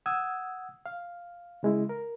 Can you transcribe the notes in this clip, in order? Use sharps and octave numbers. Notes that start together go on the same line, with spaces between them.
F#5 D#6 E6 G#6
F5
C#3 G#3 E4
A#4